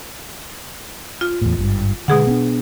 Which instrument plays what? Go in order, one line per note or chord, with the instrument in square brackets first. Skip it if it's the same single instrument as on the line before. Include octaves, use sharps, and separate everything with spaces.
[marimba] F4
[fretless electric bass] E2 A2
G#1 G2
[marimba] B2 G#4 F#5 [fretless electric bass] D3 G#3
[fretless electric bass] B3 C4 D4